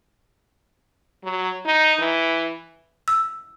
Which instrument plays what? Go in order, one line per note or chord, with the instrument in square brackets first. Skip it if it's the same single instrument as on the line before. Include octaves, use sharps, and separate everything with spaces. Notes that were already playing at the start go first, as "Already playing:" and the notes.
[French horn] F#3
D#4
E3
[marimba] E6